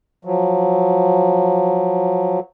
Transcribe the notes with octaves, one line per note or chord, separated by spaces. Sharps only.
F3 F#3